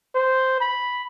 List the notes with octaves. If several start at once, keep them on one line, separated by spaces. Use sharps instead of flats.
C5
B5